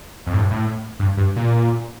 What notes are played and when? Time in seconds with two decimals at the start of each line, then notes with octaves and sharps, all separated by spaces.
0.26 F2
0.33 A2
0.38 G2
0.51 A2
0.99 G2
1.17 G2
1.36 A#2